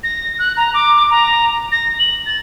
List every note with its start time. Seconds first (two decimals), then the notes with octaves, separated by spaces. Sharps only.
0.03 A#6
0.39 F#6
0.57 A#5
0.74 D6
1.10 A#5
1.72 A#6
1.99 F#7
2.26 A6